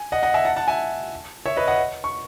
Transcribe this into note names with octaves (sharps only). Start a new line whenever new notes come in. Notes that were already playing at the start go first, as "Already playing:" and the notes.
Already playing: G#5
D#5 F#5
D#5 F#5
E5 G#5
F#5 A5
F#5 A5
E5 G#5
C#5 E5
B4 D#5
D#5 F#5
C#6